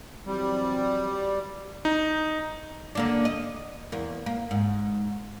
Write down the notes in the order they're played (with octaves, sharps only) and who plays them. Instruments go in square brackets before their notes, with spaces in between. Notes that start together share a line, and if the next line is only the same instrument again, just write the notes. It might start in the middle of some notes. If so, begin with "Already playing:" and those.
[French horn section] E3 F#3 C4 [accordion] G3
[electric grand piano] D#4
[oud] D3 A#3 D4
D#5
E2 A#3
A#3
G#2